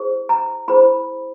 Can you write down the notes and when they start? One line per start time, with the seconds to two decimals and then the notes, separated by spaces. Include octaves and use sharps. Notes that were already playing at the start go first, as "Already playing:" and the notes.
Already playing: E4 G#4 C5
0.29 A#5
0.68 E4 G#4 C5 B5